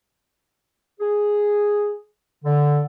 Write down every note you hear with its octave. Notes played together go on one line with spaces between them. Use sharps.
G#4
D3